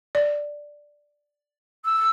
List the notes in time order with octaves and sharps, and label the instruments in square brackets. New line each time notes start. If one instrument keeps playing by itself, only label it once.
[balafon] D5
[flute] E6